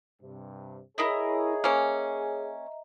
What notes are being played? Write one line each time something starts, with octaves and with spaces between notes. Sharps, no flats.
G2 C3
E4 G#4 A#4 C#5 D#5 E5 A#5 D#6
A#3 C#4 F6